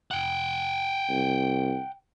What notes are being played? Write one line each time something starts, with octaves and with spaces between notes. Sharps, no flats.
F#5 G5
C2